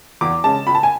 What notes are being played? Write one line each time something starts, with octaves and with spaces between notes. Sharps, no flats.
E2 D6
C#3 G#3 A5
C#2 B5
A5
G#5